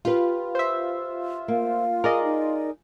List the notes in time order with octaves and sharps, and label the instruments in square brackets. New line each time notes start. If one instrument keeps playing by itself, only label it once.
[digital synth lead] F4 [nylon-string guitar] G4 B4
[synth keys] C5 E5
[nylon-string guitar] A#3 [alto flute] F5
[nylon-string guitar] G#4 [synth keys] A#4 D5 D#5
[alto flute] D#4